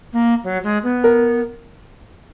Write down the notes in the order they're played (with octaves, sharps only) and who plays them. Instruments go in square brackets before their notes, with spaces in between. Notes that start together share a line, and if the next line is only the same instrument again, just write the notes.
[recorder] A#3
F#3
G#3
B3
[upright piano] A#4